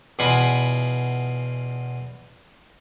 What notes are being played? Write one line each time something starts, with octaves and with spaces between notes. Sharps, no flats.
E2 B2 F4 F#5 G#5 B5